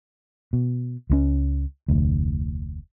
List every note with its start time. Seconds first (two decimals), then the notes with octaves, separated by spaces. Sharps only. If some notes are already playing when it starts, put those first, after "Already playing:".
0.53 B2
1.10 C#2 G#3 C#4
1.88 F1 D2